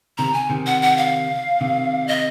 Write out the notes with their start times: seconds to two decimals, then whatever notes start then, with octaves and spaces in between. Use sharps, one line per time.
0.18 C3 D#3 A#5
0.34 G#5
0.50 C3 D#3
0.66 F#5
0.82 F#5
0.97 F5
1.61 C3 D#3
2.08 D#5